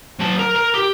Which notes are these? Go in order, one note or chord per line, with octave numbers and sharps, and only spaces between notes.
F#3 A5
A#4
A#4
G4